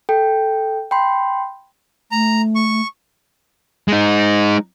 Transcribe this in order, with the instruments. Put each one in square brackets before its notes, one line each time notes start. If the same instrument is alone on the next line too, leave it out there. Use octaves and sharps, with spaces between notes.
[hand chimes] A4 G5
G5 B5 C6
[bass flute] A3 [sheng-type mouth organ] A#5
[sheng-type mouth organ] C#6
[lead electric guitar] G#3 D#4